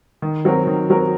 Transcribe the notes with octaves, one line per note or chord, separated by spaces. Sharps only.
D#3
F#3 C4 F#4 A#4
D#3
F#3 C4 F#4 A#4